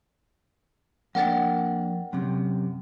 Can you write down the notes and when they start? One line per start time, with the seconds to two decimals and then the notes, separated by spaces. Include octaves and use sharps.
1.15 F2 A#3 D4 F#5 G5 A6
2.13 F#2 C3